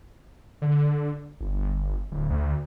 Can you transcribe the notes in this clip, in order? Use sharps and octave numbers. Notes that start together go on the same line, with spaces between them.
D3
G1
D1
D2